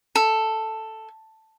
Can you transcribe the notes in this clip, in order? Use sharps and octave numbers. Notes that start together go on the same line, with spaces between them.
A4